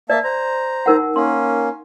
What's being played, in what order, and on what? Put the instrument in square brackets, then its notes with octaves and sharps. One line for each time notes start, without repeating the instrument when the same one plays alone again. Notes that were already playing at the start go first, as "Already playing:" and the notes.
[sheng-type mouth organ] A#3 E5 A5 [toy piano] D5
[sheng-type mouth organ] C5 A#5
[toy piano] D#4 A#4 F#5
[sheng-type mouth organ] A#3 C#4 [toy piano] C6